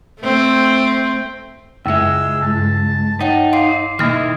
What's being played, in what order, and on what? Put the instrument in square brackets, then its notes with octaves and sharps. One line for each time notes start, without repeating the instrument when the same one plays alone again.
[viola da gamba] A3 C4
[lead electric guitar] C#2 G#3 [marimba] F#2 E5 [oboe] E6
[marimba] G2 [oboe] A5
[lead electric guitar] D#4 [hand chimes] C#5 F#5 G5
[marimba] F5 [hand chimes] C6 D6 C7
[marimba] B2 A#3 F6 [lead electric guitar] D#3 E4 [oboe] D#5